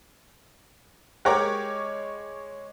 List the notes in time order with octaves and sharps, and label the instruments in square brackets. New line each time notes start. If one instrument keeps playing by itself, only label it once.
[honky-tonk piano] G#3 C#5 D6 [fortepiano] G4 A#4 F#5